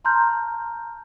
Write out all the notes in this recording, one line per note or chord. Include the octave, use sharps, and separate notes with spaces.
A5 A#5 C6 F6 G6